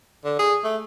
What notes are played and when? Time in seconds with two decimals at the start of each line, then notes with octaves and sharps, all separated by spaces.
0.25 D3
0.39 G#4
0.64 A3